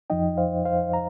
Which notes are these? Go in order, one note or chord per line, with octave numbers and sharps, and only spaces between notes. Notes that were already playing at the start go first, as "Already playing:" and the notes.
F2 F3 D#4 D#5 G5
C5 F5
C5 F5
A#5